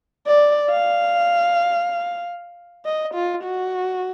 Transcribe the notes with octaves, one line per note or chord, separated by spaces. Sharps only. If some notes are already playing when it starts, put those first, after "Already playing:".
D5
F5
D#5
F4
F#4